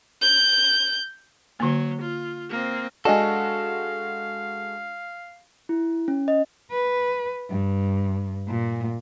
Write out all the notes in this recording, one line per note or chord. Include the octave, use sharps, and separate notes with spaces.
G6
D3 F#3 A#3
F4
A#3 C4
G#3 D4 F#4 A4 D#5 F5 G#5
E4
C#4
D#5
B4
G2
A#2